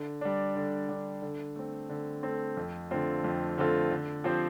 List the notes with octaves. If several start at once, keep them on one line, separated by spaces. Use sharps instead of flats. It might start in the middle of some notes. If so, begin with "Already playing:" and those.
Already playing: D3
G3 D4
D3
G3 D4
D3
A3 C4
D3
A3 C4
F2
D3 A3 C4 F4
F2
D3 A3 C4 F4
D3
F3 C4 G4 C5